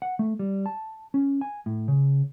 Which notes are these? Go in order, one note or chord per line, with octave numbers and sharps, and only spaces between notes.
F#5
A3
G3
A5
C#4
G#5
A2
C#3